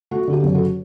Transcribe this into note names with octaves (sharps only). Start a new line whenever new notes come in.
A3 F#4
D3
G4
F#1
F#4 A4